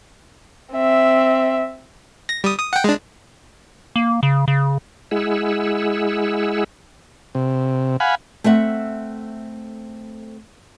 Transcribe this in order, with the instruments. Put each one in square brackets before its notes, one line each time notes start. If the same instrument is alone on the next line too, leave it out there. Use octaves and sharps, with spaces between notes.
[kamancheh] C4 E5
[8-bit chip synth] A#6
G3 D#6
D#6
F#5 G5
G#3 D4
[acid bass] A#3
C#3
C#3
[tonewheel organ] G#3 E4 G#4 F#5 E6
[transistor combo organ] C3
F5 F#5 G#5 B5
[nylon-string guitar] A3 C4 E5 F#5